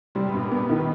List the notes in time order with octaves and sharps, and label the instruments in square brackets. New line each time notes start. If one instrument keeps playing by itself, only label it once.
[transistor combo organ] C3 [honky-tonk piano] G3
[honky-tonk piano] G2 [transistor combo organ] B2
[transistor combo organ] A#2
[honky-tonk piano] B3
[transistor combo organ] B2
[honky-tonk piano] D#3